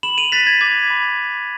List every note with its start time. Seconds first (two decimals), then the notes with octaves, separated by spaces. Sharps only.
0.03 B5 E7 F#7
0.18 D#7 F7
0.32 F#6 A6 B6
0.47 G#6
0.61 D6 G#6
0.90 B5